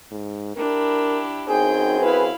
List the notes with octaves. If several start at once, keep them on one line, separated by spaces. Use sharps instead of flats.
G#2
D4 E4 G4 A#4
F#2 C4 D#4 G#4 G5 G6
E4 B4 F5 B5